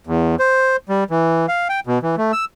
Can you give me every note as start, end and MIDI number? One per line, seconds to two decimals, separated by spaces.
0.07 0.35 40
0.40 0.76 72
0.89 1.04 55
1.11 1.46 52
1.48 1.68 77
1.69 1.80 79
1.87 1.99 47
2.03 2.15 52
2.18 2.32 57
2.33 2.45 88